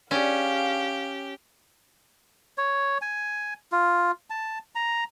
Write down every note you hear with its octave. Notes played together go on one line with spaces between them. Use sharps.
C#4 D4 G4 G#4 F5
C#5
G#5
F4
A5
A#5